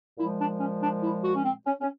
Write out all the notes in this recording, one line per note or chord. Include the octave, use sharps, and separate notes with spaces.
A#2 F3 G#3 E4
D4
C#4
D4
E4
F#4
C#4
C4
C#4
C#4